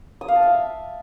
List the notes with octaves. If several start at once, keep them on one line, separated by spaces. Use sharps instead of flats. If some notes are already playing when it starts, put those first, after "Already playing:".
D#6
F5
A5
E5